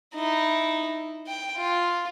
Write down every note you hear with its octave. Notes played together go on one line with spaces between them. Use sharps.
D#4 E4
G5
F4